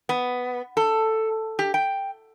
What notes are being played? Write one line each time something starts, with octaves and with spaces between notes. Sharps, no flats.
B3
A4
G4
G5